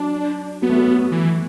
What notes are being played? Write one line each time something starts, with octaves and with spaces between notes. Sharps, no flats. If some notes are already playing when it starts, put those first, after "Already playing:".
Already playing: F#3 D4
F#3 B3
A3
F#3
E3